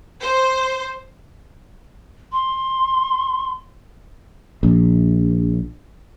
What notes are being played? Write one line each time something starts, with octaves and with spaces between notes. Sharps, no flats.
C5
C6
A#1